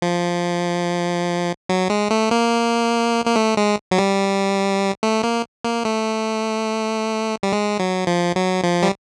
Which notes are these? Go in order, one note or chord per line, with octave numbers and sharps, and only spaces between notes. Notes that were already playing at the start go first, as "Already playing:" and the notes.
F3
F#3
G#3
A3
A#3
A#3
A3
G#3
F#3
G3
A3
A#3
A#3
A3
G3
G#3
F#3
F3
F#3
F3
G3